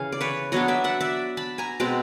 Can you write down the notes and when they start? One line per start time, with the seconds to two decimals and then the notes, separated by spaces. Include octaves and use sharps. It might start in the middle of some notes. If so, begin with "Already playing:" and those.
Already playing: C#3 E3 F5 G#5
0.12 D5
0.21 B4 C#5
0.52 F#3 B3 D4 C#5 D#5
0.68 D5 E5
0.84 E5 F#5
1.00 D5 E5
1.37 A5 B5
1.58 G#5 A#5
1.80 B2 G#3 C4 G5 A5